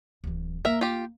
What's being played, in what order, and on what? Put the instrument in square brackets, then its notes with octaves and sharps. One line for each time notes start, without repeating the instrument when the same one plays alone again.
[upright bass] D1 E3
[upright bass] A#3 [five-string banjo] A#4 E5
[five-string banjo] F4 G4